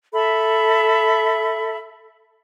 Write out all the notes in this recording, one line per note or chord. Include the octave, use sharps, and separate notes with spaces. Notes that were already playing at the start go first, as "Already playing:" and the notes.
A4 E5 B5